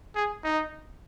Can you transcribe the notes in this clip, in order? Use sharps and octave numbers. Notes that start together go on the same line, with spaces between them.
G#4
D#4